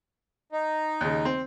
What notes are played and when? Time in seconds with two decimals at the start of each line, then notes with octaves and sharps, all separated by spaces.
0.52 D#4
1.01 D#2 C#3
1.25 C4